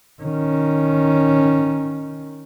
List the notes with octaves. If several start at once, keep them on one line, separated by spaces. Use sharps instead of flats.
D#3 C#4